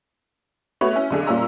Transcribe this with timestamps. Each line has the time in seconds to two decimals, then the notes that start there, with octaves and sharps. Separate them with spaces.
0.81 A3 B3 F#4 C#5 B5
0.93 C#4 E4
1.11 B1 D3 G#4
1.26 A#2 G3 A#3 C#4 A#5 E6